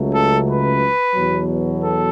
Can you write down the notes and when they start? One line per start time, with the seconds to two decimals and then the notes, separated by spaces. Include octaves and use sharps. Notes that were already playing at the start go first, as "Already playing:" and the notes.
Already playing: C#2 C#3 F#3 A3
0.13 A4
0.46 B4
1.13 E2 B2 F#3
1.79 A4